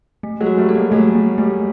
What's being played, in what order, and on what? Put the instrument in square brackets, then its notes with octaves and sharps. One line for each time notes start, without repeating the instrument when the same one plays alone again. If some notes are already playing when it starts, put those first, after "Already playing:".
[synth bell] A3
[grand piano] F#3 G#3
[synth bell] F#4
[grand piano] G3 A3
[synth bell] A4
[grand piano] G#3 A#3
[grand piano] F#3 G#3 [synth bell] A3
[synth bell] A3
[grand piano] G3 [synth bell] A3